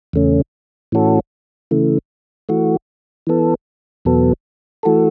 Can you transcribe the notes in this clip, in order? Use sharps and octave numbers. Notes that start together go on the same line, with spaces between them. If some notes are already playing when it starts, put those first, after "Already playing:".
E2 C#3 A3 C#4
A2 E3 C#4 F#4 A4
C#3 E3 A3
E3 A3 F#4
E3 B3 A4
E2 B2 F#3 B3 A4
E3 A3 F#4 A4